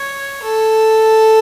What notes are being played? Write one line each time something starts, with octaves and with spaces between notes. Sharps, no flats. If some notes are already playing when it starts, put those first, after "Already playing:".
Already playing: C#5
A4